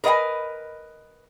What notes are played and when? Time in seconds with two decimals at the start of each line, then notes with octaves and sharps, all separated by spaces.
0.04 A#4 B4 D#5 F5 G#5